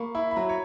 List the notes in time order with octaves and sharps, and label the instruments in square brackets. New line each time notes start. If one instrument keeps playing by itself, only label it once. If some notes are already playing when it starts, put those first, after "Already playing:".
Already playing: [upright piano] A#3 [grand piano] B5 C#6
[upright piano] E4 [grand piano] B5
[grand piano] B5
[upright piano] F#3 [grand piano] A#5
[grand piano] C#5